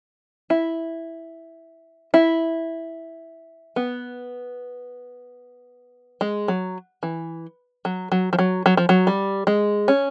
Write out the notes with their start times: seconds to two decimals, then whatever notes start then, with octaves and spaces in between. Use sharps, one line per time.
0.50 E4
2.14 E4
3.76 B3
6.21 G#3
6.48 F#3
7.03 E3
7.85 F#3
8.12 F#3
8.33 F3
8.39 F#3
8.66 F#3
8.77 F3
8.89 F#3
9.07 G3
9.47 G#3
9.88 C#4